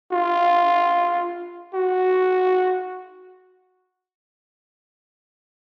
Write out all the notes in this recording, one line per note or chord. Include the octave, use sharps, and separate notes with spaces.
F4
F#4